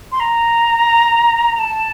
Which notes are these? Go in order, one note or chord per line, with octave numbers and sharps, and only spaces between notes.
C6
A#5
A5